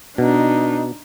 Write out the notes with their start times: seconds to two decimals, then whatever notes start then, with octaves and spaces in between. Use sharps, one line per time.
0.18 B2 D4 D#4